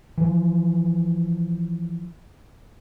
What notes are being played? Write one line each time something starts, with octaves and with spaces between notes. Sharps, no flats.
E3 F3